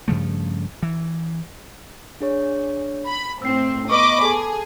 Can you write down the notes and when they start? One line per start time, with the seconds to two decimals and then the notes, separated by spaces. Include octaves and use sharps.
0.08 G2 C#3 F3 A3
0.83 E3
2.20 D4 G#4 C#5
3.06 B5
3.42 A2 C4 E6 C7
3.90 B3 B4 D#5 B5 C#6 D6
4.23 G#4 A4 A5